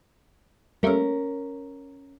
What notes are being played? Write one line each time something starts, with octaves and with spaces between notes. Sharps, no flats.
G3 A3 A#3 C#4 A#4